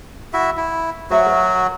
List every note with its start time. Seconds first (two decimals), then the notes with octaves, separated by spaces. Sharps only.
0.33 E4 F#4 E5
0.57 E4
1.10 F#3 F#4 C5 E5 F#5
1.26 A#4 B4